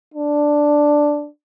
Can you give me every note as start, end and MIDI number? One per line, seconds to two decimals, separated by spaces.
0.14 1.26 62